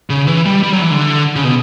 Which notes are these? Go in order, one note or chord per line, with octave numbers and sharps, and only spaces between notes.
C#3
E3
G3
G3
F#3
E3
D3
C#3
B2